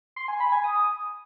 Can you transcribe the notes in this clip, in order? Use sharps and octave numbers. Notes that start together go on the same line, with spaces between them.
C6
G#5
B5
G#5
D#6